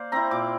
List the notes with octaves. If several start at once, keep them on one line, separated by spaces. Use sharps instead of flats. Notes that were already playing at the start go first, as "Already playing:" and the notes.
Already playing: A#3 C5 D5
C4 E4 A#5
A#2 D6